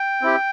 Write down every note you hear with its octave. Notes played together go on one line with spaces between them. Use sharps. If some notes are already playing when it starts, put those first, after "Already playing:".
Already playing: G5
C4 E4 G4